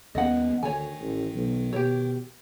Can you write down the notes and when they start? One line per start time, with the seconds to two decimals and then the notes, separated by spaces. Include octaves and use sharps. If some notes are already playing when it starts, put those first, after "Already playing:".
0.15 D#2 D#3 B3 C#4 D#5 F#5
0.63 D2 D#3 C#5 G#5
1.01 A1
1.34 B1
1.73 B2 G4 C#5